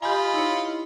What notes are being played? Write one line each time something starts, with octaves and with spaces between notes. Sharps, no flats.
F4 G4 D#5 G#5 B5
D#4 E4 C#5